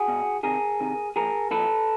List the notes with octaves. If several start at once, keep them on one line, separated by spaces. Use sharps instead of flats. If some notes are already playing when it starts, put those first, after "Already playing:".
Already playing: F#4 G#4
B2
C3 D#3 G#4 A#4
C3 D#3
A#2 F3 G#4 A#4
A#2 F3 A4 B4